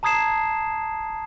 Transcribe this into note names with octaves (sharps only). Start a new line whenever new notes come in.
A5 A#5 D#6 G#6 C7 E7